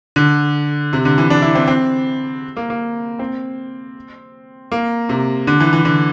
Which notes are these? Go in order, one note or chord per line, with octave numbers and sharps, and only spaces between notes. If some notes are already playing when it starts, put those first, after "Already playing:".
D3
C3
D3
E3
D4
E4
C4
C4
A#3
A#3
C4
A#3
C3
D3
E3
E3
D3